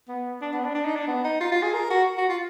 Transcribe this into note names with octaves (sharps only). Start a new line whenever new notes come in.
B3
D4
B3
D4
D4
D#4
D4
B3
D#4
F4
F4
G#4
A#4
F#4
F#4
F4